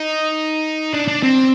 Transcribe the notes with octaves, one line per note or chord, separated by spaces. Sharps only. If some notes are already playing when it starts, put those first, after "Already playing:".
Already playing: D#4
D4
D4
C4